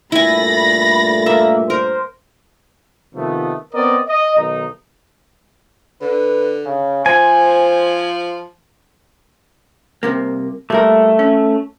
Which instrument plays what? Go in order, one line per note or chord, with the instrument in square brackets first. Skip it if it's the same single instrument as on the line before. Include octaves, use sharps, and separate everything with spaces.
[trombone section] G2 A#2 A3 [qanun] E4 G#5 [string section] B5 A6 A#6
[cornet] A#3 [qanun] E5
[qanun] A#4 [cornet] C5
[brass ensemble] C3 D#3 F3 A3 B3
B3 C4 A#4 D5 D#5
D#5
B1 D#3 D#4
[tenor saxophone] D3 [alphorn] B4
[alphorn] C#3
[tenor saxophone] F3 [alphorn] C5 [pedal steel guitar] G#5
[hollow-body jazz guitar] C2 C3 A#3
[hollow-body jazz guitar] A#2 G3 A#4 [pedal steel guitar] A3
[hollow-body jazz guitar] C#4